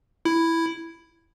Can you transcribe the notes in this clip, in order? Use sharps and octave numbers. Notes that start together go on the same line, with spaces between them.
E4